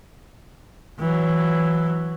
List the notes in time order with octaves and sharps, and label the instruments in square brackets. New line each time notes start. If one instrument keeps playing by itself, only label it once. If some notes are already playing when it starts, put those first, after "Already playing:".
[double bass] E3 F#3